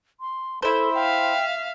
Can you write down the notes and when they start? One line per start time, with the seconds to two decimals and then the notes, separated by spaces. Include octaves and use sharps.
0.20 C6
0.63 E4 A4 C5
0.94 E5 F5 G5